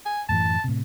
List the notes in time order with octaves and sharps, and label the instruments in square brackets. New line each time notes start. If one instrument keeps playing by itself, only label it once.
[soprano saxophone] G#5
[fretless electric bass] F#2 A2 E3 [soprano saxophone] A5
[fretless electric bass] A2 C3